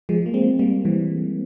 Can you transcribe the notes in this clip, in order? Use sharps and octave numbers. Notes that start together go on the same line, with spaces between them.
F3 G#3
A#3
G#3 C4
G3 A#3
E3 G3